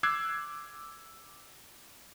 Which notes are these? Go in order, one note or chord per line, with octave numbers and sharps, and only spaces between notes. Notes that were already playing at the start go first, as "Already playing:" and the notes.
D6 E6 F#6 G#6 C7